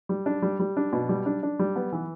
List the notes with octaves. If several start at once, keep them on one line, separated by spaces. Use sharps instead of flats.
G3
D4
G3
G3
D4
B2
G3
D4
D4
G3
B3
E3